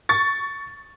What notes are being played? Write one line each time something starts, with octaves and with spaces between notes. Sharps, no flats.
C#6 A6